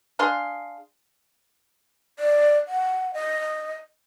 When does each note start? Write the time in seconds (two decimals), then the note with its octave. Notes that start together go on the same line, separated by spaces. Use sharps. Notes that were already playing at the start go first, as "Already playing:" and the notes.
0.19 D4 G#4 F5 C6
2.19 D5
2.68 F#5
3.14 D#5